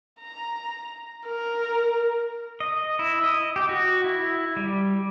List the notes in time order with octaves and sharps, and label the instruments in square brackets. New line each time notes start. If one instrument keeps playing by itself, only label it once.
[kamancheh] A#5
A#4
[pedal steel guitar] D#5
E4
D#5
G4
F#4
E4
G3